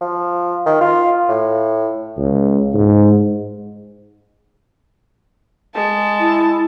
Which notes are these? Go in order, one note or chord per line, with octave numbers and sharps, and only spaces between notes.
F3
D#3
F4
A2
C#2
G#2
G#3 A5
E4